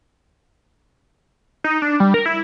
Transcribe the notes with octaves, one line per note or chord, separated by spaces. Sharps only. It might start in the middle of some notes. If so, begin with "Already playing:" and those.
D#4
D4
G3
A#4
E4